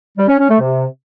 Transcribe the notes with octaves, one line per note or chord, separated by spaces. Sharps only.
G3
C#4
C#4
A3
C3